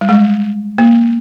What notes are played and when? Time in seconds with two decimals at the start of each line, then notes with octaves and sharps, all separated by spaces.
0.01 G3
0.09 G#3
0.78 A#3